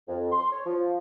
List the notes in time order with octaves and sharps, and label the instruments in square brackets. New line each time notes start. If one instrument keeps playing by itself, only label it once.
[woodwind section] F2
C6
C#5
F3